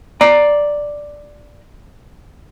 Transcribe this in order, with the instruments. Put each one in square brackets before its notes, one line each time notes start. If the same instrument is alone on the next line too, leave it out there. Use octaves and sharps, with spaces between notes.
[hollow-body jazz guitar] D5 A#5